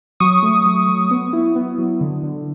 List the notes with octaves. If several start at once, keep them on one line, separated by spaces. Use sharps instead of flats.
F#3 C#6 D#6
A3
F#3
F#3
B3
E4
B3
F#3
D3
D3